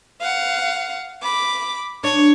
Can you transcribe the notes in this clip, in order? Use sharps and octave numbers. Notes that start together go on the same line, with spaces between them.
F5 F#5
B5 D6
D4 C#5